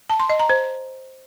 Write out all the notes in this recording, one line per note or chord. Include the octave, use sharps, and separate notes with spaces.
A5
C6
D#5
A#5
C5